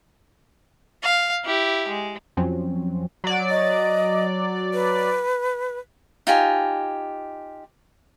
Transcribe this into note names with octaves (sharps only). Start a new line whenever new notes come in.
F5
E4 G4
G#3
F2 F3 F#3 C4 C#4
F#3 D5
D#5
B4
D#4 F4 G4 G#5